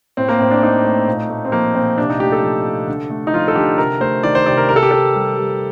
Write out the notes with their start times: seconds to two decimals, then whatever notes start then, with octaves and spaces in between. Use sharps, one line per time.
0.17 A2 C4
0.28 A#3
0.40 A2 C4
0.51 D4
0.63 A3 D#4
0.84 A3
1.08 A#2
1.30 A3
1.45 C4
1.52 F3 A#3
1.75 A#2 C4
1.98 C3 D4
2.10 D#4
2.20 A3 G4
2.32 A4
2.42 F3
2.66 C3
2.88 D3
3.10 A3
3.27 D#4
3.33 F3 F4
3.48 A4
3.55 D3 G4
3.78 C3 A#4
4.01 A3 C5
4.23 D#3 D5
4.35 C5
4.46 C3 D5
4.57 A#4
4.69 C3 A#4
4.76 A4
4.83 G4
4.91 C3 A4
5.14 G3
5.37 G3